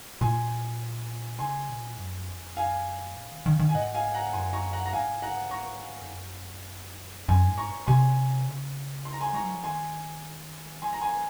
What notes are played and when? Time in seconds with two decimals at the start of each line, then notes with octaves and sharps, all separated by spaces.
0.21 A#2 G#5 C6
1.39 C#3 G#5 C6
1.69 A#2
1.97 F#2
2.28 F2
2.57 F#2 F5 G#5
3.15 A#2
3.30 D#3
3.46 D#3
3.59 D#3
3.69 G#5
3.74 G#2 D#5 F#5
3.94 F5 G#5
4.14 F#5 A#5
4.33 F#2 G#5 C6
4.53 A#5 C#6
4.73 F#5 A#5
4.86 A#5
4.92 G#2 F5 G#5
5.22 F#5 A#5
5.51 A#5 C#6
6.01 F2
6.10 F#2
7.28 F#2 G#5 C6
7.48 G#2
7.57 A#5 C#6
7.87 C3 G#5 C6
8.46 C#3
9.05 C6
9.13 A#5
9.21 G#5 C6
9.33 G#3 A#5 C#6
9.43 F#3
9.53 F3
9.64 D#3 G#5 C6
10.82 F3 G#5 C6
10.93 A#5
11.01 G#5 C6